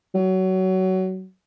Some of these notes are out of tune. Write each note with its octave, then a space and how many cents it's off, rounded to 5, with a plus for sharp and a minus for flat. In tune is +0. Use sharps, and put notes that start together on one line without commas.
F#3 +20